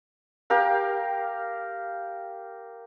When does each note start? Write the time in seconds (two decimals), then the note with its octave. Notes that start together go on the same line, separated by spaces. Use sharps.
0.50 G4 A#4 F5